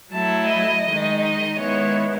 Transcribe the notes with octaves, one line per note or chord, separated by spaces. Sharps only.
F#3 A3 E4 A5
D#5
D#3 G#3 D#4
D#5
D#3 G#3 B3 E4 C#5